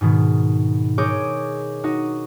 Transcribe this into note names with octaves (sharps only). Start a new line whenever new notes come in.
G#2 B2 D#3
G#4 A#4 C#5 D#5 D6 G6
D#4 F#4 D#5